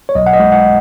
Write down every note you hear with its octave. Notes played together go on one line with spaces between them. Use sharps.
C#5
B1 D#5
F#5
D#5
G#3
F#5